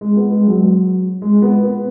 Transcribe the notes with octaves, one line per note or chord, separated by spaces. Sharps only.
G#3
B3
G#3
F#3
G#3
B3
B3